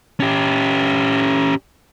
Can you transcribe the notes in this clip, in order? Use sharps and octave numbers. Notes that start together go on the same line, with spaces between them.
C#4 G4